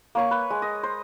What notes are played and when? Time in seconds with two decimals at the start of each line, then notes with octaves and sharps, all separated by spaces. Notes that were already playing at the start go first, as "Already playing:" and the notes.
0.15 A#3 C#5 C#6
0.31 B4
0.50 G#3
0.62 D#5
0.83 C5